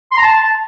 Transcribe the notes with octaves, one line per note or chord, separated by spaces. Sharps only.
C6
A#5
A5